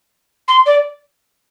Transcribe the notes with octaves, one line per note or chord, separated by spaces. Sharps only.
C6
D5